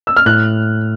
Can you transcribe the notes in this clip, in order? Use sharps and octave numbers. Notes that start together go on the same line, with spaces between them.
E6
F6
A2 F#6